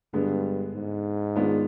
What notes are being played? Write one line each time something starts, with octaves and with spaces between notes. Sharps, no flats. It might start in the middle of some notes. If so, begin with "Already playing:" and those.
G2 D3 G#3 B3
G#2
D#3 G#3 B3 D4 F4